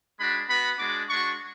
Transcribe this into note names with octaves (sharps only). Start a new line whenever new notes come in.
G#3 D4 F#4 B5
B3 F#4 B5
G#3 D4 F#4 D6
G#3 D4 F#4 C#6